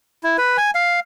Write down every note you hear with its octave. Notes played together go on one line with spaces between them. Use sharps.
E4
B4
G#5
F5